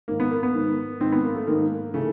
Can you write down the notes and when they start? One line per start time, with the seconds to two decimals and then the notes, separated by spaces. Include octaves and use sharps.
0.08 G#2 D#3 A#3
0.20 B3
0.31 A#3
0.43 B3
0.55 G#2 D#3
1.01 G#2 D#3 C4
1.12 B3
1.24 A#3
1.36 A3
1.47 G#2 D#3 A#3
1.94 C#3 E3 A3